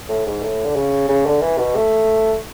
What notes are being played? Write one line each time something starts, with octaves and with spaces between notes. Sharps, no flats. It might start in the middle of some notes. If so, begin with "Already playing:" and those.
A2
G#2
A2
D3
C#3
C#3
D3
E3
B2
A3